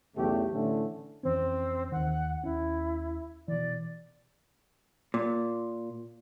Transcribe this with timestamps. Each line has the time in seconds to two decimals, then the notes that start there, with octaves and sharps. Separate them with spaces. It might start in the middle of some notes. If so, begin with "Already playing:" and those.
0.16 B1 E2 C#3 A3 G4
0.53 A2 D3 E3 A3 C#4
1.23 F2 E3 C4 C#4
1.92 D#2 D#3 F#5
2.43 D#2 C#4 E4
3.48 B2 E3 D5
5.14 A#2